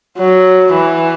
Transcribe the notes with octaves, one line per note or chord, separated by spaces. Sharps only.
F#3
E3